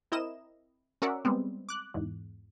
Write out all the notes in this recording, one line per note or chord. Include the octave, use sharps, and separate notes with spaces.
C4 E4 A#4 D#5 E7
C#4 F#4 A#4 D5 E5 F#5
G3 G#3 B3 C4
D6 F#6
E2 G#2